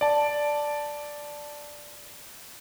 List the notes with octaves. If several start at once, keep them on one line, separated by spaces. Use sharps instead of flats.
D5 A5